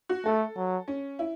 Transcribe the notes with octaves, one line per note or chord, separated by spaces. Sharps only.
F#4
A3 A4
F#3
C#4
E4